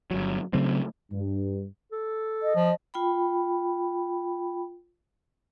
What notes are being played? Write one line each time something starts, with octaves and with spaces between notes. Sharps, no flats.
G1 F#3
C#3 F#3 A3 C4
G2
A4
D#5
F3
F4 G5 B5